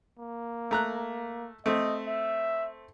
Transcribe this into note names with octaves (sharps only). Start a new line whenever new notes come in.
A#3
A3 A#5 F#6
A3 C4 D#5
E5